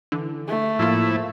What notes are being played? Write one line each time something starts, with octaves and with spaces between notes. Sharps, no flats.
D3 E3
A3
A2 F3 A#3 E4 F4